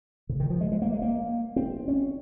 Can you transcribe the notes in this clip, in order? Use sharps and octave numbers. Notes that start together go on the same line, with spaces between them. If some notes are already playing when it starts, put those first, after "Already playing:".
C#3
D#3
F3
G#3
G#3
A#3
G#3
A#3
C4
C#4